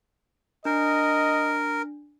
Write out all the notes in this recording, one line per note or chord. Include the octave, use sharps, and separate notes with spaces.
D4 A#4 D#5